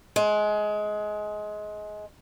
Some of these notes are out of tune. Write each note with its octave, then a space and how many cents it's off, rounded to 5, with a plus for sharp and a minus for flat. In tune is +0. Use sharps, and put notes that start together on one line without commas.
G#3 +20